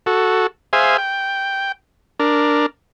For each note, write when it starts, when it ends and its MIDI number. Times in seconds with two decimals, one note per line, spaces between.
0.06 0.47 66
0.06 0.47 69
0.73 0.97 68
0.73 0.97 72
0.73 0.97 76
0.73 0.97 77
0.73 0.97 80
0.98 1.72 79
2.20 2.66 62
2.20 2.66 70